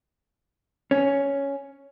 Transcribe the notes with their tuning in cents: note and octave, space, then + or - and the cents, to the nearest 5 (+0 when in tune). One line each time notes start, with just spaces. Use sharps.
C#4 +5